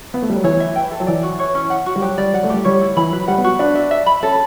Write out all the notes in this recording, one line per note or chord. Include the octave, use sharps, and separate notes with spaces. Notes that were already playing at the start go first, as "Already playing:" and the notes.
B3
A3
G3
F#3
E3 C#5
E5
G5
A4
F#3
E3 D5
F#4
C#5
C#4
F#5
F#4
G3
F#3 G4
G3 D5
F#3 F#5
A3
G3 G4
G3 C#5
E4
E3 B5
F#3 B4
G3 F#5
B3
F#4
D4 B4
E5
E5
B5
C#4 A4